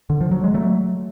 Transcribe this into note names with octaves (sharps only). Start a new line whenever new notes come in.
D3
F3
F#3
G#3
F#3 A3